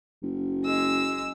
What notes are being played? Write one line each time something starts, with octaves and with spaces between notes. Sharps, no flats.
F#1
G#3 E6